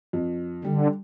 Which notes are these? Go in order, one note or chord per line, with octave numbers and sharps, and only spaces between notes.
F2
D3 G3